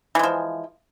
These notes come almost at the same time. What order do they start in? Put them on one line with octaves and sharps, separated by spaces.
E3 G#3 F3